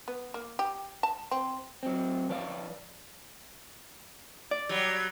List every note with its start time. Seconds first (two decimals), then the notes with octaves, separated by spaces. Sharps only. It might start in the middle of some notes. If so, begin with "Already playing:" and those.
0.08 B3
0.34 A#3
0.59 G4
1.03 A5
1.31 C4
1.83 F#3 C4
2.29 F3 B4 C#5 D5 E5 F5
4.51 D5
4.69 F#3 G3